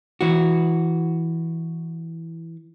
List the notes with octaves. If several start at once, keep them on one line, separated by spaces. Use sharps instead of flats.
E3 F#4